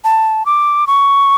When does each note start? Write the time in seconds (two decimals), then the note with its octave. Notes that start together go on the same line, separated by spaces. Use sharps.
0.04 A5
0.46 D6
0.87 C#6